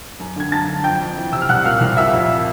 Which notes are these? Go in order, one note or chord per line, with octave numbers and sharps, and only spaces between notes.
F#2
D3 G#6
F#2 A5 A6
D3
F2 G5 G6
F2
E3
C3 E6
F6
C2 F#5 F#6
A#2 F5 F6
C2 F5 F6
A#2 E5 E6
F2